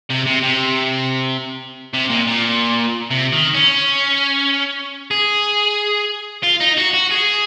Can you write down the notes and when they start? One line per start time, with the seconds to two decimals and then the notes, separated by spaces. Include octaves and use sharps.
0.10 C3
0.27 C3
0.43 C3
1.93 C3
2.09 A#2
2.27 A#2
3.11 C3
3.33 D#3
3.55 C#4
5.11 G#4
6.43 F4
6.61 D#4
6.78 F#4
6.94 F#4
7.11 G#4